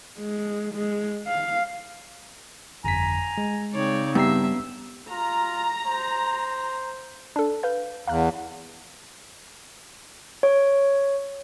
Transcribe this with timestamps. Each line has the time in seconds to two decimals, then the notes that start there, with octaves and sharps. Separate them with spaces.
0.18 G#3
0.73 G#3
1.27 F5
2.84 G1 F2 G#5 A#5 B6
3.38 G#3
3.73 C#3 C4 D#4 C#5 D5
4.15 G2 B3 E5 A#5 C7
5.10 F4 A#5
5.86 C5
7.36 D4 A4
7.63 B4 F5 G6
8.07 E2 F5 A#5 F#6
10.43 C#5